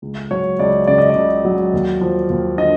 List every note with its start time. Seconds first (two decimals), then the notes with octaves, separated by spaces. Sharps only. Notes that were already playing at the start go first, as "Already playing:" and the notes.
0.02 C#2
0.31 F#3 C#5
0.59 C#2 D5
0.87 C#3 D5
0.98 D#5
1.10 D5
1.16 C#2
1.45 F#3
1.73 D#2
2.01 F3
2.30 D#2
2.58 D3 D#5